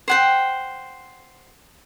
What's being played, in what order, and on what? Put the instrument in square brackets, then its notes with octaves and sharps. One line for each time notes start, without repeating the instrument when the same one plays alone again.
[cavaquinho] C5 F#5 G5